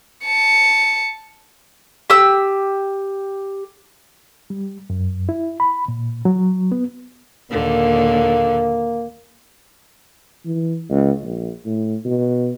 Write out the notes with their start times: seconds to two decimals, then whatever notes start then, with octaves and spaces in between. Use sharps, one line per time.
0.25 A5 C#7
2.10 G4 E6
4.50 G3
4.90 F#2
5.29 E4
5.60 B5
5.88 A#2
6.25 F#3
6.72 B3
7.51 D#2 A#2 D3 A#3
10.45 E3
10.90 C#2
11.23 A#1
11.65 A2
12.05 B2